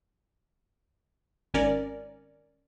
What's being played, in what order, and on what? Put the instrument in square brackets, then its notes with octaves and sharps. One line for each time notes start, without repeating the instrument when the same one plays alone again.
[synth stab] G#1 C#4 A#4 D5